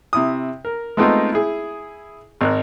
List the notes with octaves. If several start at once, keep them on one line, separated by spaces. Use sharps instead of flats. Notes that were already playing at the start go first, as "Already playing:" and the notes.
C3 E4 D#6
A#4
G#3 A3 B3 C4 D#4 F4
E4 G#4
G#1 A#4 F#6